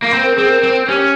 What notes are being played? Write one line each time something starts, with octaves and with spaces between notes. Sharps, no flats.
A#3
C4 C5
A#4
C4 G#4
A#4
C4
C#4 G4